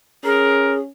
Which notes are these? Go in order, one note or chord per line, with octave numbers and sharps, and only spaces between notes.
C#4 G#4 A#4